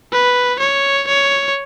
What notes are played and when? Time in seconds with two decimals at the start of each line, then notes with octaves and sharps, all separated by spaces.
0.12 B4
0.60 C#5
1.08 C#5